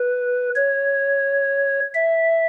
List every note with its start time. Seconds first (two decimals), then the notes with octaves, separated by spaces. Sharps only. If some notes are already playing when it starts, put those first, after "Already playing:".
Already playing: B4
0.56 C#5
1.94 E5